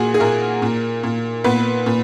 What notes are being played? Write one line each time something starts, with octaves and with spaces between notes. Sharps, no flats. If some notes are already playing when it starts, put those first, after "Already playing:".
Already playing: A#2 F#4 G#4
G#4
A#2 A#3 A#4
A#2
A#2
A#2 B3 B4
A#2